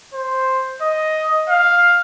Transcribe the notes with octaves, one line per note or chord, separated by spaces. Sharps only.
C5
D#5
F5